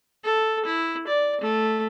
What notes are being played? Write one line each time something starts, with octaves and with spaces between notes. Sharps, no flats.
A4
E4
D5
A3